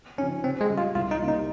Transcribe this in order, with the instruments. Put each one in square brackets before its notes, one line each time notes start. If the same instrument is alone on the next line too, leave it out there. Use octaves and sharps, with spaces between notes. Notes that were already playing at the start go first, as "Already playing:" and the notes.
[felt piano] F3 C4 D#4 [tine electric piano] C#4
[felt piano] C3 [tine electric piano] C4
[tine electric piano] G#3
[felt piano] G3 C#4
[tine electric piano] F4
[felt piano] C2 [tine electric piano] F4
[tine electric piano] D#4
[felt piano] C3 G3 A#3 C#4
[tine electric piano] D#4